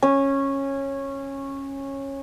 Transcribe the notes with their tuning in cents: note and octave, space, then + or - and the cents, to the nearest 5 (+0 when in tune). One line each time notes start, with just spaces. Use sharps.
C#4 -15